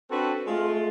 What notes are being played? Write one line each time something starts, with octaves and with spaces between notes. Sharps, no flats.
C4 D4 F#4 A4 B4
G#3 A3 F4